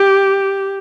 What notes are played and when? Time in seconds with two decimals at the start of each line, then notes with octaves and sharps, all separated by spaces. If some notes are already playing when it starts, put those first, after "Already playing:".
Already playing: G4